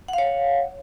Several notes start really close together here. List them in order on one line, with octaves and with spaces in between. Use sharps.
F#5 F5 C#5